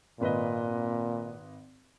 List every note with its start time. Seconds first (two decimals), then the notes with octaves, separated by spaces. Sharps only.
0.20 G#1 A#2 B4 D#5